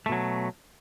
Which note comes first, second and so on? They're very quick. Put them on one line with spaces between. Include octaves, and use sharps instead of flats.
A3 B2 F#3